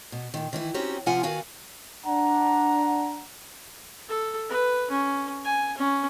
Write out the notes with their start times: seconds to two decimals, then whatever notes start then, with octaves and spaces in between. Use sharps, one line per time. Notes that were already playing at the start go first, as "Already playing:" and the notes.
0.12 B2
0.34 A#2 D#3
0.53 D#3 E3 E4
0.74 C4 C#4 D#4 F#4 G4
1.06 C3 F3 C#4 F4 F#5 G#5
1.23 D#3 B3 F#4 F5 G#5
2.06 D4 F#5 A#5
4.09 A4
4.49 B4
4.90 C#4
5.45 G#5
5.78 C#4